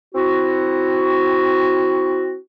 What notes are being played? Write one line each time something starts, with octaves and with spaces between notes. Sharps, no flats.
C4 E4 F#4